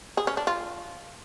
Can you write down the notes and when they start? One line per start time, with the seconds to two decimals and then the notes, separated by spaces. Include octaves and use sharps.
0.17 G#4
0.27 C#4
0.37 D4
0.47 F4